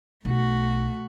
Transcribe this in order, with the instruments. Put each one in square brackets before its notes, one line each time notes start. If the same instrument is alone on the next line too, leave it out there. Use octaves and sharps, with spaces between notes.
[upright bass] B1 [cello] A3 F#4